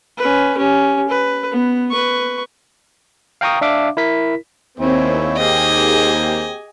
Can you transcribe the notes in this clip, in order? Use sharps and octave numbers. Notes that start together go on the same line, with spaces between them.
C#4 B4
C#4 G4
B4
B3
B4 C#6
F5 G5 A#5 C#6 D#6
D4 E5 F5 D6
E4 A#4 B6
D#2 C4 E4 C#5 G#5
A#3 C4 G4 G#4 D#5 G#5